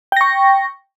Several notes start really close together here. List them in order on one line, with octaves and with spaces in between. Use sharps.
G5 A#6 C#6